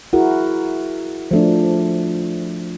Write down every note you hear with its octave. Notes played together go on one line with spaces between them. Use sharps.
E4 F#4 G#4 A#4
F3 A3 D4